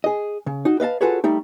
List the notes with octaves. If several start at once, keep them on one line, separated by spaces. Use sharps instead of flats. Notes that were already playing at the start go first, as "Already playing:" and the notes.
G#4 D#5
C#3
D#4 F#4
B4 D#5 F5 A5
F4 F#4 G#4 A4 B4 C#5
G3 A3 D#4